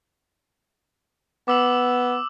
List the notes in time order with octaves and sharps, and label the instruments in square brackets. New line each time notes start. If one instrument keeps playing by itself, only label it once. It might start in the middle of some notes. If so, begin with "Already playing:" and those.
[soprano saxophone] B3 [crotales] D6 E6 F#7